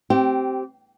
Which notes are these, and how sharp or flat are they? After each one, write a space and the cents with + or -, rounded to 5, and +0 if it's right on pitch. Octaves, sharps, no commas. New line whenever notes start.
C4 +0 G4 -20